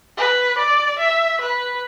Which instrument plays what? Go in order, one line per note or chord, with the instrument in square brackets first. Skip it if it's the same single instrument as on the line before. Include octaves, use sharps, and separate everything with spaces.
[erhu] B4
D5
E5
B4